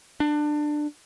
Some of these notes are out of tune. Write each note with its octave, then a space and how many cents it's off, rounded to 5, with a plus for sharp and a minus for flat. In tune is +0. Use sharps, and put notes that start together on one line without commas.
D4 +20